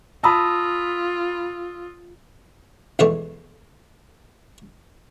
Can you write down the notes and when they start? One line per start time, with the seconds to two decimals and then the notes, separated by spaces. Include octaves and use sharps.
0.24 F4 A5 B5 D#6 E6 A#6
2.99 B1 E2 B2 G#3 A3 A4